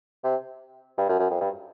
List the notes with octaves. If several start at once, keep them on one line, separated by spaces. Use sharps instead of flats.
C3
G2
F#2
F#2
F2
G2